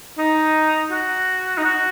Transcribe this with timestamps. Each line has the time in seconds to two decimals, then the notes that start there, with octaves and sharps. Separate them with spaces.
0.18 D#4
0.91 F#4
1.57 D#4
1.64 F#4